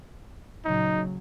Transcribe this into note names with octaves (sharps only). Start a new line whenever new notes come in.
A#2 C#3 F#3 D#4